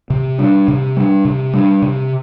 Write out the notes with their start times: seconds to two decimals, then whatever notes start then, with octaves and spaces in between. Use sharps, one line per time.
0.10 C3
0.38 G3 D4
0.68 C3
0.97 G3 D4
1.25 C3
1.53 G3 D4
1.82 C3